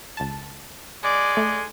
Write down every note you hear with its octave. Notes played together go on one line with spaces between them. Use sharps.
C#2 A5
G#3 D5
A3